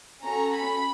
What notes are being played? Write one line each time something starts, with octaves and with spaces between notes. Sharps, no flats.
C#4 F#4 A4 A#5
B5